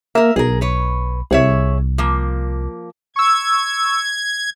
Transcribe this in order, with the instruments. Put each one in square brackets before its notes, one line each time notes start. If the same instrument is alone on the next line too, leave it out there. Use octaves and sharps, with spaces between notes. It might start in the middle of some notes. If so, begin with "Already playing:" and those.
[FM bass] A#3 [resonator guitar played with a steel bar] A#4 E5
[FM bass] B1 [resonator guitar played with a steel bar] G#4 A#4
[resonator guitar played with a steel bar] B4 C#5
[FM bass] C2 [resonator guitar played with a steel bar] G#4 C#5 E5
[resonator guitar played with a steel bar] F3 A#3
[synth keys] C#6 E6 [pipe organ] G#6